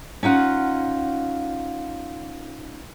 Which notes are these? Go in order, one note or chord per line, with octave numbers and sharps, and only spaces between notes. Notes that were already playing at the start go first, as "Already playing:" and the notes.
C#4 D#4 F4 F#5